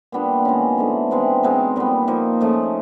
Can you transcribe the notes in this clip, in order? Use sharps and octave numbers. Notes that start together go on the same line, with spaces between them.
A#2 G3 B3 D4
D#3 G#3 C#4
F3 A3 D4
C3 E3 G#3 C4
B2 G#3 C4 D#4
A#2 G3 B3
F3 A#3 D#4
C#3 F3 A3